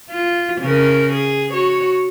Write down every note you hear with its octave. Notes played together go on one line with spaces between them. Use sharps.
F4
C#3 A#4
G#4
F#4 C#5